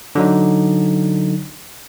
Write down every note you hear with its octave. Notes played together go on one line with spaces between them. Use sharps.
D3 F#3 D#4